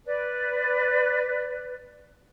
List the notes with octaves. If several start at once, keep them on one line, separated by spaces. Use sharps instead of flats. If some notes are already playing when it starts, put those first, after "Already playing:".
B4 D5